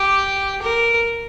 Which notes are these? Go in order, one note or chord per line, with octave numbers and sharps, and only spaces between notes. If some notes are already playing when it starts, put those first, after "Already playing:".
Already playing: G4
A#4